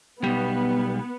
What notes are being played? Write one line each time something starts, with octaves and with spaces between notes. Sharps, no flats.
B1 G3 B3